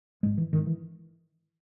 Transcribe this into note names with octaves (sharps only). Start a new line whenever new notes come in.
G#1 G#2 G#3
E3
G#1 G#2 D#3
E3